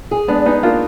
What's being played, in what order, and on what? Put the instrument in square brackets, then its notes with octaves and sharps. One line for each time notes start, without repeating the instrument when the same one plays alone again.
[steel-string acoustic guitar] G#4
[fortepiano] G#3 B3 [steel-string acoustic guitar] D4
[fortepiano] B3 D#4 [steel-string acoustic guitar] G#4
[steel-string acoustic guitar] A#3 [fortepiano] D4 F4